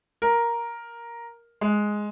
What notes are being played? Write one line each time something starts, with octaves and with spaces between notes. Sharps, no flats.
A#4
G#3